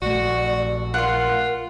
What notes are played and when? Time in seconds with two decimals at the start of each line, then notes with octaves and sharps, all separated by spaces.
0.02 A#1 A3 F#4 D5
0.94 F4 A#4 F#5 C6